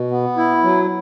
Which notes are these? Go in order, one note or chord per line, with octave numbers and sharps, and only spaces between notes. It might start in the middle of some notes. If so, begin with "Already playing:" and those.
Already playing: B2
B3
E4
F#3